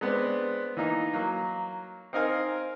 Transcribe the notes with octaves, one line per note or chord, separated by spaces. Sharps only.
G#3 B3 C4 D4
E3 A#3 D#4
F#3 A#3
C4 D#4 A#4 D#5 F5 G#5